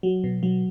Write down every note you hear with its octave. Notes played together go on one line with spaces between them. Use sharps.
F#3
B2
F#3